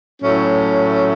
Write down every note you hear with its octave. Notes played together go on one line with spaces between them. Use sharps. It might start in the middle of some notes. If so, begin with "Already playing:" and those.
A2 F#3 A3 C#4